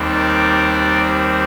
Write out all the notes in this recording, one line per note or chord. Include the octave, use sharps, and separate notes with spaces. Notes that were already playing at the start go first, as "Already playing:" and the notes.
Already playing: D#2 D#3 G3 C4
A#4 D5